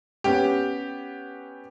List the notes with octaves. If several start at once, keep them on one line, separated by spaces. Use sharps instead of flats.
B3 C#4 G4